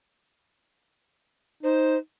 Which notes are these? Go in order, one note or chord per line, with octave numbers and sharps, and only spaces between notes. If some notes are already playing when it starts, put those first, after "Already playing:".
D#4 C5